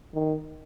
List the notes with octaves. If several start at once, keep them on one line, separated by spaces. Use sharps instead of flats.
D#3